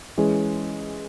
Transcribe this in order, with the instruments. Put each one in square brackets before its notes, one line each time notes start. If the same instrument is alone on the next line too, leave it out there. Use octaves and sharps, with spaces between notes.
[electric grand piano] E3 G#3 C#4 G#4